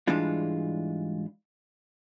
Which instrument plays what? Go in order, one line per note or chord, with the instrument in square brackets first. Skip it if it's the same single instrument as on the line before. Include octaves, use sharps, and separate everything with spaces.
[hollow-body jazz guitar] G#2 E3 G3 G#3 D4 F4